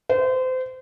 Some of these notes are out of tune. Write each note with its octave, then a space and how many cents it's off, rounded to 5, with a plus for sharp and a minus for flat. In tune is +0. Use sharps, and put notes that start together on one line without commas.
C5 -30